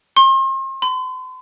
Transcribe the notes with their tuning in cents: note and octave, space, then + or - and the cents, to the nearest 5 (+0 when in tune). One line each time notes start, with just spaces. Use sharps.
C6 +40
C6 -45